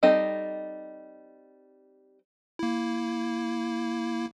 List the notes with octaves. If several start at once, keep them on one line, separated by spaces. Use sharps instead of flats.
G3 C4 D#4 A4 D#5
A#3 E4